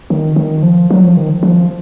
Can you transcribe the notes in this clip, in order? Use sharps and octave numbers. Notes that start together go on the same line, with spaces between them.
D#3
D#3
F3
F#3
F3
D#3
F3